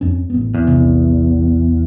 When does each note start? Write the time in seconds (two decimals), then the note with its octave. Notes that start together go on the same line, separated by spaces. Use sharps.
0.01 F2 C#4
0.30 A1 B3
0.55 E2
0.67 A#1 C3